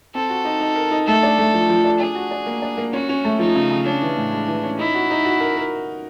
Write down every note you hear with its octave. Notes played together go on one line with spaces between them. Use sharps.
C4 A4
F#4
D#4
D#4
A#4
D#4
A3 A4
D4
A3
F3
F3
D4
D4 G#4
F#4
D4
A#3
D4
A#3
C#4 F#4
C#4
A3
F3 D#4
C#3
C#3
C#4 D4
E3
A2
G#3
E3
C#4
D#4 E4
F#4
D#4
F#4
A#4
A#4